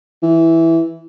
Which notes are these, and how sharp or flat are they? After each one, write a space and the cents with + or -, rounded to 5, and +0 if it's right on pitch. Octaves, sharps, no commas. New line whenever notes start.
E3 -5